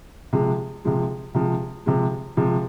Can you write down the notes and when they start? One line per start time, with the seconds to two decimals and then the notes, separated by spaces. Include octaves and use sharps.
0.33 C3 F3 G#3
0.85 C3 F3 G#3
1.35 C3 F3 G#3
1.86 C3 F3 G#3
2.37 C3 F3 G#3